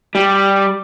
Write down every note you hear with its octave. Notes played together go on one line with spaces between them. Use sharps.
G3